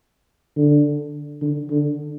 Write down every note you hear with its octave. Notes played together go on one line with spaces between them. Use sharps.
D3
D3
D3